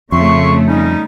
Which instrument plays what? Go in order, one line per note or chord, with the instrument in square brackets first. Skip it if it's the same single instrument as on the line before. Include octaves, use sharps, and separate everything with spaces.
[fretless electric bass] F2 [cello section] C#3 A3 [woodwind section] E5 C6 C#6
[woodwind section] G3 C#4 D#4